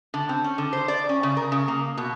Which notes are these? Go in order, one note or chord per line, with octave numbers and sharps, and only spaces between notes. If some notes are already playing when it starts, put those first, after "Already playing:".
D3
C4
C#4
D3
C5
D5
C#4
C#3
A#4
C#3
A#3
B2